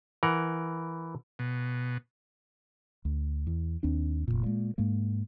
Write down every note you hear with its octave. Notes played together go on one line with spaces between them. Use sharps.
E3 A#4 F#5
B2
D2
E2
D#2 C4 D4
F1 F2 A#2
A#2 G#3
G#2 G#3 A#3